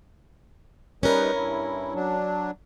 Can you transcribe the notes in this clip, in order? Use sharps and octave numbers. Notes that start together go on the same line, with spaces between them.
G3 C#4 D#4 A#4 B4
G2 E4
F#3 D4